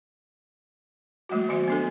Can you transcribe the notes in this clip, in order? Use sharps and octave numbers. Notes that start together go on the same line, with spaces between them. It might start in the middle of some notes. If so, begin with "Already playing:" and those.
F3 G3 A3 A#3 F#4
D#3 F#3 B3 F#4 C5 E5
B3 D4 A4